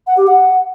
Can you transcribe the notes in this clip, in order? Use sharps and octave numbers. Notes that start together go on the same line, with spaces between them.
F#5
G4
F#5